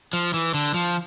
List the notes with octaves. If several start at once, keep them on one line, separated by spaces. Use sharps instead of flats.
F3
E3
D3
F3